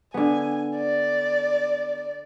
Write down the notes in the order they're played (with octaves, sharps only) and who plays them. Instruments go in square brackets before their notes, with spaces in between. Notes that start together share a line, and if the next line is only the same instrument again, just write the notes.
[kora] D3 B3 [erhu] G#5
[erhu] D5